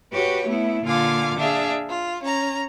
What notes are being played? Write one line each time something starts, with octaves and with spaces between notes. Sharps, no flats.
F#4 G4 B4 C#5
A3 B3 E4
A#2 D3 F4 F5 G#5 D6
D4 G#4 E5 F5
F4
C#4 A#5